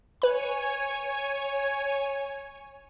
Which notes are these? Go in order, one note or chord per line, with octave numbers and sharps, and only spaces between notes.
B4 C#5 G#5 B5